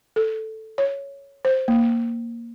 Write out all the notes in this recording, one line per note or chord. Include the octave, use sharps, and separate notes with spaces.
A4
C#5
C5
A#3